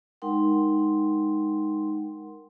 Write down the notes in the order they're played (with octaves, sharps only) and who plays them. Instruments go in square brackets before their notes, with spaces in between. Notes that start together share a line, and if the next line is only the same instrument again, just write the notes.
[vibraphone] G#3 D#4 A#4 F#5 G5 C6